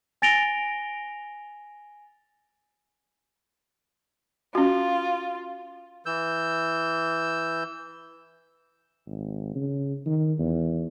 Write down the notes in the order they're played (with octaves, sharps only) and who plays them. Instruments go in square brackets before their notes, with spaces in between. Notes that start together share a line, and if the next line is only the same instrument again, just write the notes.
[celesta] G#5 A6 A#6 D7 F7 G7
[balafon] C#4 F#4 [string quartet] F4
[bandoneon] E3 E6 G6
[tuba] G#1
C#3
D#3
E2